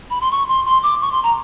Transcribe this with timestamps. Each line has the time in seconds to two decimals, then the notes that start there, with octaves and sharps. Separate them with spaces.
0.10 B5
0.21 C6
0.31 C#6
0.49 C6
0.66 C6
0.83 D6
1.01 C#6
1.12 C6
1.23 A#5